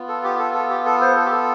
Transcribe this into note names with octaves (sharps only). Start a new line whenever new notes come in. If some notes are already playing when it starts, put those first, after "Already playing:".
Already playing: B3 F4
A4
G4
A4
A4
G4
A4
C5
A4
G4
A4